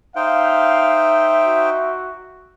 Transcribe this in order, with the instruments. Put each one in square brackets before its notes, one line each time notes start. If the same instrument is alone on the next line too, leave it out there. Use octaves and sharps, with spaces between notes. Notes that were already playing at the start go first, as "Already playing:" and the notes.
[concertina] D#4 C5 G5 [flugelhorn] E5 [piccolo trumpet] F5
[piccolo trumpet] F#4